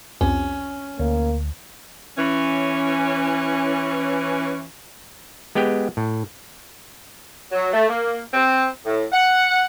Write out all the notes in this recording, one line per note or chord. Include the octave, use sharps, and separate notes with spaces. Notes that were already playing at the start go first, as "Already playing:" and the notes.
C2 F2 C#4
D2 A#3 C#5
E3 C#4
G#3 B3 G4 G5
A2
F#3
A3
A#3
C4
A2
F#5